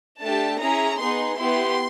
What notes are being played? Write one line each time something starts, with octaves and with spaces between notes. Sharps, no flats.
A3 D4 G4 A5
C#4 E4 G#4 A#5
B3 D#4 G#4 C6
B3 E4 G4 C6